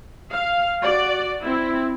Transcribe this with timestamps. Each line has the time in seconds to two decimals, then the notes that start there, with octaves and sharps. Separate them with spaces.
0.32 F5
0.82 F#4 D5
1.41 C4 E4